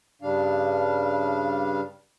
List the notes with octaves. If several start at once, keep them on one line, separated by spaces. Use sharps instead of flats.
G2 C#3 G3 D4 F5